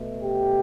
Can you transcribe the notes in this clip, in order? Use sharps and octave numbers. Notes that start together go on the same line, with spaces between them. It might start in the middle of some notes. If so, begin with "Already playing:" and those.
Already playing: B2 A3
G4